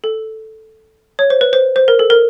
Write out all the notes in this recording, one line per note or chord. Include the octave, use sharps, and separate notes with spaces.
A4
C#5
C5
B4
C5
C5
A#4
A4
A#4